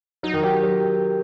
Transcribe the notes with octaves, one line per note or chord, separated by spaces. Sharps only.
F#3 D#4
D#3
F#3 G4
F#3